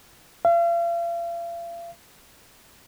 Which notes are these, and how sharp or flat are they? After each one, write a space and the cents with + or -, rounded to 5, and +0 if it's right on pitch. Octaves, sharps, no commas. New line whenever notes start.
F5 -40